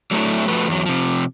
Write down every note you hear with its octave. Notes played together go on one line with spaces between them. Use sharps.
F#3 A3 D4 E4
F3 A3 F#4 B4
E2 F#3
C3 F3